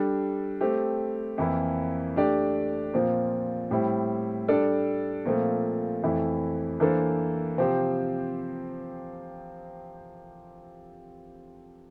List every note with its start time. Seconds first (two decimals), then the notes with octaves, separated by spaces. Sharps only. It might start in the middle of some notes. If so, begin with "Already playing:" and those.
Already playing: G3 D4 A4
0.61 A3 C4 G4
1.38 F2 E3 A#3 E4
2.16 A3 D4 G4 D5
2.94 A#2 F3 C4
3.71 A2 G3 C4 E4
4.48 G3 D4 A4 D5
5.26 A#2 F3 A3 C4
6.03 F2 E3 A3 E4
6.80 E3 A#3 D4 A4 C5
7.58 C3 F3 C4 G4 C5